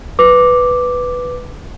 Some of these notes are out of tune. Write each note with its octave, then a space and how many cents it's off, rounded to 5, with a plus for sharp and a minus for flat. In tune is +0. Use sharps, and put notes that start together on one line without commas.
B4 +0 D6 +0